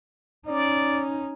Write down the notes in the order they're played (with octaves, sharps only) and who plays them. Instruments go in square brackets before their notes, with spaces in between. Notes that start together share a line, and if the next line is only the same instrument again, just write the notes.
[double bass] C#4 D#4 [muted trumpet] D5